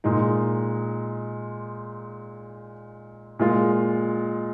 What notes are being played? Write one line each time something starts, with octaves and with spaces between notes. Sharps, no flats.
A#2 G#3 D#4
A#2 G#3 F4